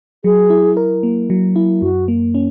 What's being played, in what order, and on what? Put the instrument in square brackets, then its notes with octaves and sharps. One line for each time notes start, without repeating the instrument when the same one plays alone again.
[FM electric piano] F#3 [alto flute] G#4
[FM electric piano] E4
A#4
A#3
F#3
E4
[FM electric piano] F#2 [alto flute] F#4
[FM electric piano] A#3
C#4